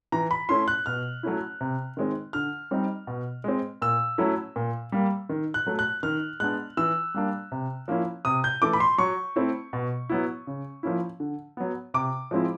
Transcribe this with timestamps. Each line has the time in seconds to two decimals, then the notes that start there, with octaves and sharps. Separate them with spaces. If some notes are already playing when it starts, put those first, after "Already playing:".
0.12 E3 A#5
0.31 B5
0.49 A3 C#4 E4 C6
0.68 F#6
0.86 B2 F6
1.23 F#3 A3 C#4 E4
1.61 C3
1.97 D#3 G#3 C4
2.33 D3 F6
2.71 G3 C4 D#4
3.07 B2
3.44 G#3 C4
3.82 A#2 E6
4.18 F#3 A3 C#4 E4
4.56 A#2
4.92 G3 A#3
5.29 D#3
5.54 F#6
5.66 F#3 A3
5.79 F#6
6.03 D#3 F6
6.40 G#3 B3 D4 F#6
6.77 E3 E6
7.14 G3 A#3 D4
7.52 C3
7.88 F3 A#3 C#4 E4
8.25 C3 D#6
8.44 G6
8.62 E3 A3 D6
8.73 B5
8.80 C6
8.98 F#3 C#6
9.36 A3 C4 E4
9.73 B2
10.09 F#3 B3 E4
10.47 C#3
10.83 F3 A#3 C#4 E4
11.20 D3
11.57 F#3 B3
11.94 C3 D6
12.31 F3 G#3 C4 E4